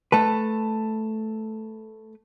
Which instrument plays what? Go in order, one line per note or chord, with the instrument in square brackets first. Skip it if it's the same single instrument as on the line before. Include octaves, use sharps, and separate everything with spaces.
[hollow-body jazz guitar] A3 B4 [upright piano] A5